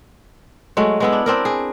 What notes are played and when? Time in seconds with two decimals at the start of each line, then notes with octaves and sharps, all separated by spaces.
0.77 F#3 G#3 A3
1.00 G#3 B3 E4
1.12 D4
1.26 C4 D4 A#4
1.45 G#4